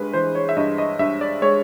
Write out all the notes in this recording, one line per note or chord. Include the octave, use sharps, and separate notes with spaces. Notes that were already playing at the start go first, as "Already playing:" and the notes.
Already playing: G2 G#3 B4
E3 C5
C#5
E5
G2 D#5
D#5
G2 E5
D5
G#3 C#5